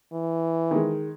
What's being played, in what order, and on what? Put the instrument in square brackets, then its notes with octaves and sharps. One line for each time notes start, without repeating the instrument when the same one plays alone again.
[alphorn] E3
[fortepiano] D#3 G#3